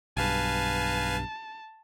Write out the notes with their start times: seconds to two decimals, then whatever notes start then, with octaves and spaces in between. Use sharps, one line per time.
0.17 B1 G2 B4 F5 G#5 A5